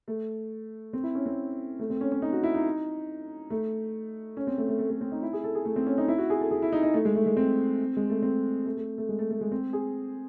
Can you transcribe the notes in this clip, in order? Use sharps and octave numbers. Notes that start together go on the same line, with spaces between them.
A3
C4
E4
C#4
C4
A3
C4
C#4
C#4
D#4
F#4
E4
D#4
A3
C#4
C4
A3
A3
A3
A3
C4
D#4
E4
G#4
A4
G#4
A3
C4
C#4
D#4
E4
F#4
G#4
A4
G#4
E4
D#4
D#4
A3
G#3
A3
G#3
C4
G#3
A3
C4
A3
A3
A3
G#3
A3
A3
G#3
C4
G#4